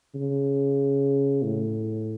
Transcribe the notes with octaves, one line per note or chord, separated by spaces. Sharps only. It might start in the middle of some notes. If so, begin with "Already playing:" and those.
C#3
A2